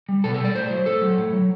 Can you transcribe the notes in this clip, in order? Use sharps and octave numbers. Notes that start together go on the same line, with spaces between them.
G3
B2 A4
A4
G3
D5
A2 C5
F#3
A2 A4
F#3
A2
F#3